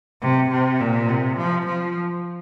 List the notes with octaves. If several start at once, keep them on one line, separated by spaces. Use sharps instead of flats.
C3
C3
A#2
C3
F3
F3